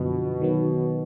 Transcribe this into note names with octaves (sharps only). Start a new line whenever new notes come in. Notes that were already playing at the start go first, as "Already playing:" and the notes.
Already playing: F#2 B2 D3 F3
D#3 F#3 B3